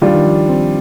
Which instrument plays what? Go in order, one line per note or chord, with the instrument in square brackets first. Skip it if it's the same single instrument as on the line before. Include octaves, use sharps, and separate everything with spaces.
[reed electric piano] D#3 [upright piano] G3 D4 F4
[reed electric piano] D#3
F3
C4